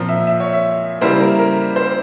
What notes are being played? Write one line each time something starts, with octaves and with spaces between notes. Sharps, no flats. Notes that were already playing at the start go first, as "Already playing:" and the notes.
Already playing: A#2 F3 C4 A#4
E5
E5
C#5
E5
C#3 G3 A#3 E4 C5
A#4
A#4
C5